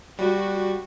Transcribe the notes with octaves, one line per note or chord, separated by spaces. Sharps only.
G3 F#4